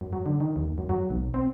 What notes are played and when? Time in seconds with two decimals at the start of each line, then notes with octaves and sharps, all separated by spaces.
0.01 F#2
0.13 F#3
0.26 D3
0.40 D#3
0.56 D#2
0.78 F#2
0.89 F#3
1.10 B1
1.34 C4